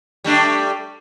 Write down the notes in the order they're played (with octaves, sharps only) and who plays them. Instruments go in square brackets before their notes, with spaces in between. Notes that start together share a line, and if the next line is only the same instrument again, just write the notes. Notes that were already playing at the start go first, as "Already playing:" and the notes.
[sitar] G3 A3 D4